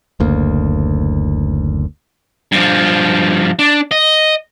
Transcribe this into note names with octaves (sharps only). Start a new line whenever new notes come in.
F#1 D2 A#3
G2 F3
D4
D#5